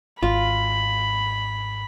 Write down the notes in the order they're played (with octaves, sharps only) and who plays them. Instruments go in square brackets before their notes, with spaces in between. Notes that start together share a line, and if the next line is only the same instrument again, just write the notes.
[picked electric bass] G#1 [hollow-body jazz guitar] F4 [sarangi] B5